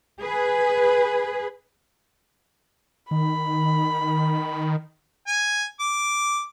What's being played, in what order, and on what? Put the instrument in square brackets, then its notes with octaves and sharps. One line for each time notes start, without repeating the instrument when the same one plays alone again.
[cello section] G#4 B4
[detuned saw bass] D#3 [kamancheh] B5
[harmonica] G#5
D6